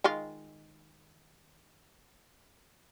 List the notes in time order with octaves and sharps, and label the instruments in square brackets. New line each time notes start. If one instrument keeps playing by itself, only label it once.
[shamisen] D#3 G#3 F4